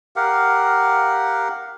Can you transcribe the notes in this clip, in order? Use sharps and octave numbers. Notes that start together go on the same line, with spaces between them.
G4 A#4 F5 F#5